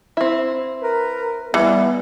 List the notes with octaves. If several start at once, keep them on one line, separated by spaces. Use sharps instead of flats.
C4 E4
A#4 B4
E3 G3 B3